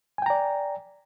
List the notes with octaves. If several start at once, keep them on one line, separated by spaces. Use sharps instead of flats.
D5 G5 G#5 A#5